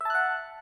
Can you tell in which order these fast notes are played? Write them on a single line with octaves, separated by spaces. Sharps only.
E5 A5 F#6 F#5